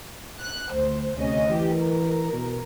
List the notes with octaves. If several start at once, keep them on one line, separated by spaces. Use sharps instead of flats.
F#6
D2 C5
D2 C3 C#4 D#5
E3 G4
A#4
B2